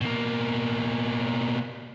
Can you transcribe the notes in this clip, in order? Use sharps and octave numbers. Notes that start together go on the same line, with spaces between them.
B2 A#3